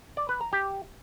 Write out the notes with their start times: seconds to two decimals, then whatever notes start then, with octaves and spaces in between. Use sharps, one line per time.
0.17 D5
0.29 B4
0.41 A#5
0.53 G4